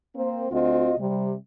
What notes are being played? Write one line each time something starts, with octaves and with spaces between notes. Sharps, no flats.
A#3 C4 C5
D2 C4 F4 F#4 D#5
C3 G3